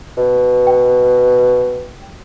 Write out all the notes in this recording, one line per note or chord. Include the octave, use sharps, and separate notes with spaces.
B2
G5